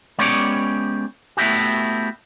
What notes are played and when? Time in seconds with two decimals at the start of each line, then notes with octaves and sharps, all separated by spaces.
0.19 G#3 B3 C#4 G4 C#5 D5
1.37 A3 B3 E4 F#4 G4